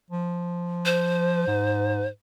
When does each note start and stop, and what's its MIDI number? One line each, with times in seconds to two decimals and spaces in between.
0.10 1.47 53
0.85 2.08 72
1.47 2.08 44